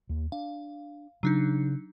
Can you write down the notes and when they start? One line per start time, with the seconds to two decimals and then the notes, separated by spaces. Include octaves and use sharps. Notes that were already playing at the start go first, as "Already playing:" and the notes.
0.09 D#2
0.32 D4 F5
1.23 C#3 F#3 D4 D#4